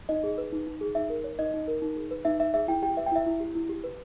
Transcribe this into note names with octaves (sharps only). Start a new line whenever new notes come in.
D#4 D#5
G#4
B4
D#4
D#4
G#4
D#4 E5
A#4
C#5
D#4 D#5
D#4
A#4
D#4
G#4
B4
D#4 E5
D#4 E5
G#4 E5
E4 G5
G4 G5
B4 E5
G5
E4 E5
E4
G4
E4
G4
B4